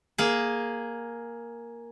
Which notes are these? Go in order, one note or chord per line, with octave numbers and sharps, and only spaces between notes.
A#3 G#4